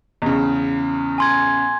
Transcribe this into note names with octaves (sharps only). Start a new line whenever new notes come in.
E2 C#3
G#5 C6 G#6